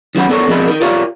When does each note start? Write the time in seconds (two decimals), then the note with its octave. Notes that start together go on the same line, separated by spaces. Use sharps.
0.15 D#3 F#3 C#4 F#5 B5
0.29 B3 D4 A4 A#4 C#5
0.48 F2 B2 G#3 D4 A#4 B5
0.68 D#4 A#4
0.81 F4 G4 A#4 C#5 D5 F5